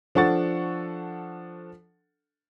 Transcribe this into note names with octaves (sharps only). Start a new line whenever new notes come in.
F3 D4 A4 F#5 C#6 A6